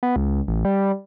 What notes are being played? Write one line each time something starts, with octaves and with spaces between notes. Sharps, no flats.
B3
C#2
A1
G3